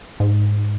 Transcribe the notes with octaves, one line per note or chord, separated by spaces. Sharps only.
G#2